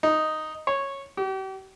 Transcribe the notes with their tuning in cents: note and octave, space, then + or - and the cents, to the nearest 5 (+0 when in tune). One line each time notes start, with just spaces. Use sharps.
D#4 +0
C#5 -10
G4 -40